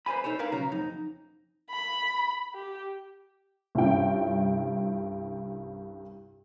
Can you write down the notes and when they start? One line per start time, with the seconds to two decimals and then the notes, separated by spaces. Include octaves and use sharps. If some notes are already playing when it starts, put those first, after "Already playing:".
0.06 B4 C5 D#5 G#5 B5
0.24 D#4 A4 C5 C#5
0.39 A#4 B4 C#5 F5 A#5
0.52 B1 C#3 F#4 A#5
0.72 F2 D#4
1.70 B5
2.54 G4
3.75 C2 G2 C#4 F4 G5